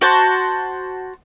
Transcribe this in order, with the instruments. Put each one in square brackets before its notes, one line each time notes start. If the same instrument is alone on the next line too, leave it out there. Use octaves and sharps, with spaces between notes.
[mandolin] F#4 C5 A5